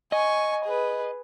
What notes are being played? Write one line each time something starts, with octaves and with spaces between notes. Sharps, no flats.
D#5 G#5 C#6
G#4 B4